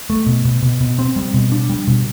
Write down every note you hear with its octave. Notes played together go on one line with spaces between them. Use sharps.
A3
B2
B2
B2
B2
C4
G3
B2
D4
G3
B2